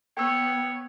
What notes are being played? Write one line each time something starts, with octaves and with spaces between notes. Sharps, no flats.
B3 C#5 G5 E6